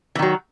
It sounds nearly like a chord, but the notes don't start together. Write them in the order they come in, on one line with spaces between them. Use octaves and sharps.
E3 D#3 F#3